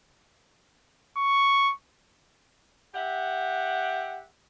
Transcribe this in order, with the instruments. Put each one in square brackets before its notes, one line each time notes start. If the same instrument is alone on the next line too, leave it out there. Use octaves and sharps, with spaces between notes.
[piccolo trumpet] C#6
[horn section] G4 E5 F#5